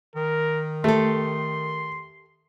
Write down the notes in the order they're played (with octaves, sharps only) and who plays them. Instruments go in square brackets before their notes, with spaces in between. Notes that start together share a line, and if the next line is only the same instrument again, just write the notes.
[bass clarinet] D#3 [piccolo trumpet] A#4
[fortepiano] A3 [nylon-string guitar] G4 A4 [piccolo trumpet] C6